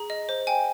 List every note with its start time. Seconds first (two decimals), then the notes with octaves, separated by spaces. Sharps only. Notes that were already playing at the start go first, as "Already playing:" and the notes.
Already playing: G#4 A#5
0.10 D#5
0.29 C5
0.47 G5 G#5